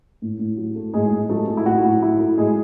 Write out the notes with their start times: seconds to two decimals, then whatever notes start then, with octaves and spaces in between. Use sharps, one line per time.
0.22 A2
0.39 A2
0.57 F#3
0.75 A3
0.94 A2 G#3 G#4
1.12 A2
1.29 F#3 A3 A4
1.48 A3
1.57 E4
1.65 A2 F#4
1.84 A2
2.02 F#3 E4
2.19 A3
2.38 A2 G#3 G#4